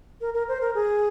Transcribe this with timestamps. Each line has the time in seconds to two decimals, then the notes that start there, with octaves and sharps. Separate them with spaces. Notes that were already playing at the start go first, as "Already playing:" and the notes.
0.21 A#4
0.34 A#4
0.48 C5
0.61 A#4
0.75 G#4